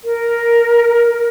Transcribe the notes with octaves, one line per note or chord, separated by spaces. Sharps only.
A#4